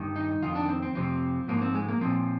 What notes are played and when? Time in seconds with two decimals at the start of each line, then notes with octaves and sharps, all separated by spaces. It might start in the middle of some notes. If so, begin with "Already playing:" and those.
Already playing: G2 D#3
0.16 D#4
0.42 F2 D#3 F4
0.55 D4
0.68 C4
0.82 C4
0.95 F2 C3 F3 C4
1.48 G#2 F3 A#3
1.62 C4
1.75 G#3
1.88 A#3
2.01 A#2 F3 C4